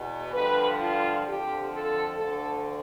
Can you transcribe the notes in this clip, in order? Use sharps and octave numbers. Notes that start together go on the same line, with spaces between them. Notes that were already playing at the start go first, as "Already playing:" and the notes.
Already playing: E2 B2
G2 D3 F3 B4
F4
F2 D3 F3 G4
A4
D2 D3 F3 A4